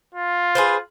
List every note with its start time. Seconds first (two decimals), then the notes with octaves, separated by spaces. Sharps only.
0.15 F4
0.55 G#4 B4 C5